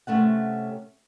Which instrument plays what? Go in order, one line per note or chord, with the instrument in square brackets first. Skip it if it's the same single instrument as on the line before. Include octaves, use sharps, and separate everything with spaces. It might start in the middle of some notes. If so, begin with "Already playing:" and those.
[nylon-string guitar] C3 A3 C#4 F#5